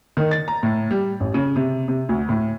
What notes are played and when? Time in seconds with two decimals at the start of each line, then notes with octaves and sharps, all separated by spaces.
0.17 D#3
0.31 A6
0.48 A#5
0.63 A2
0.91 G3
1.20 A1
1.34 C#3
1.56 C3
1.88 C3
2.09 D2
2.29 A2